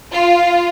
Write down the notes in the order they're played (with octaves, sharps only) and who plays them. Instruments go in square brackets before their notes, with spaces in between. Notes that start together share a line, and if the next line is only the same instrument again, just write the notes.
[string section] F4